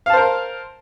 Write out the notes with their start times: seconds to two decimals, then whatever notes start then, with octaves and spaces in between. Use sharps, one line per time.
0.06 F5
0.10 A5
0.13 C5
0.17 A#4